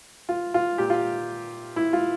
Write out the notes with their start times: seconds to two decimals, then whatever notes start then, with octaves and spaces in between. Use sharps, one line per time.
0.29 F4
0.54 F4
0.78 A#2 G4
0.90 F4
1.76 E4
1.93 F4